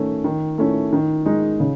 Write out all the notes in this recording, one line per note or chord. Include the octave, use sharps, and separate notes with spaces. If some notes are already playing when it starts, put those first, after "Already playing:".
Already playing: D#3 A3 C#4
D#3
A3 C#4 E4
D#3
G#3 D#4
C#3